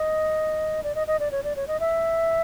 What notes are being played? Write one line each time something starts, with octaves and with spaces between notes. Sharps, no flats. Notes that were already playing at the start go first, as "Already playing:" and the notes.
Already playing: D#5
D5
D#5
D#5
D5
C#5
D5
C#5
D#5
E5